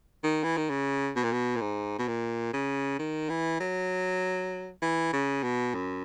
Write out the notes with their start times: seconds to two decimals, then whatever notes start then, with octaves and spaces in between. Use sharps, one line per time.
0.24 D#3
0.44 E3
0.57 D#3
0.70 C#3
1.16 B2
1.24 A#2
1.32 B2
1.56 A#2
1.61 G#2
1.99 B2
2.08 A#2
2.53 C#3
2.99 D#3
3.30 E3
3.60 F#3
4.82 E3
5.13 C#3
5.43 B2
5.74 F#2